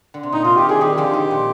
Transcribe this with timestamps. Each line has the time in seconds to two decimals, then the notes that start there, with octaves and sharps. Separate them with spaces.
0.14 D3
0.23 C3
0.32 A#2 D#4
0.44 C3 F4
0.57 D#3 G4
0.69 D#3 G3 G#4
0.81 D#3 G3 G4
0.98 D3 F3
1.14 D#3
1.31 A#2